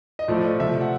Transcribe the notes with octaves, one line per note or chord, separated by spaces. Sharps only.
D#5
A2 F3 A3 D5
C3 F3 A3 E5
F#5